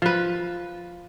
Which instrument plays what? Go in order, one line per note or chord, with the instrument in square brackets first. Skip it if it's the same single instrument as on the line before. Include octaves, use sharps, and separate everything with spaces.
[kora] F3 B4